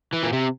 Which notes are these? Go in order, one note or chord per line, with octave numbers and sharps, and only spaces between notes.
E3
A#2
C3